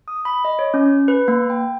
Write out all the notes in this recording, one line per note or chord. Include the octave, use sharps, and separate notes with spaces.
D#6
B5
D#5
C#5
C#4
B4
A#3
G5